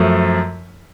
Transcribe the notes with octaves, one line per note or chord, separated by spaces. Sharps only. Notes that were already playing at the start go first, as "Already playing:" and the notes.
Already playing: F#2 F3 A3